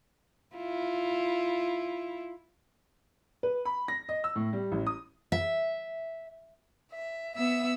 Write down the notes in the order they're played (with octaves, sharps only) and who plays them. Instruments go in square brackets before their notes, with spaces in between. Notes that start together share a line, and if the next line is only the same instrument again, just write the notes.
[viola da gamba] E4 F4
[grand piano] B4
B5
A#6
D#5
E6
A2
G3
A1
D#6
[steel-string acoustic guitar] E5
[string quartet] E5
B3 E5 E6